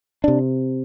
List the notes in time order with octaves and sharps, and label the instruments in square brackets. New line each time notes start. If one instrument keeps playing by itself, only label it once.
[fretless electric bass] C3 D4